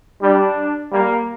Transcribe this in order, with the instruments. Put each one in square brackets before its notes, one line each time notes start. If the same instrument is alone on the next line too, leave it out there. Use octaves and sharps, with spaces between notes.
[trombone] G3 [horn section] D4
[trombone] G3 [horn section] A#3